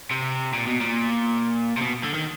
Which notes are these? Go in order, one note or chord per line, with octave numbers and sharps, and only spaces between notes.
C3
A#2
B2
A#2
C3
B2
D3
D#3